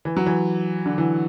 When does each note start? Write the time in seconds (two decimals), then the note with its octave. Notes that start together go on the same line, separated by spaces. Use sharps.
0.05 E3
0.16 F#3
0.26 E3
0.86 D3
0.98 E3